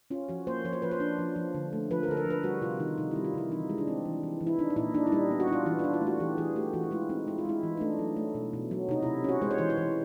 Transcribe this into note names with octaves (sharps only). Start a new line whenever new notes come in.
C#4 F4
F3 F#4
A#3 C5
F3 C#5
C5
F3 B4
C5
D4
F3
F3
D3
A3
F3 B4
A#4
D3 A4
A#4
F3
B4
G3 F#4
C3 F4
D#3 D#4
C3 D#4
E4
G3
F4
C3 E4
E3 D#4
G#3
D4
C4
E3
E3
E3
E4
D4 D#4
D#4
A#2 E4
D4 D#4
E4
G3 D#4
B3
F#4
D4 F4
E3 E4
F4
D4
F4
A3
F#4
E3 G4
E3 G#4
A3 G4
E3 F#4
E4
G#3 F4
C4 D#4
G#3 E4
F4
G#3 E4
E3
D#4
A3 D4
F#3
A3
B2
B2
F#3
C3 D#4
E4
C3
C#4 F#4
G#3 C5
C#5
E3 C5
C#5
E3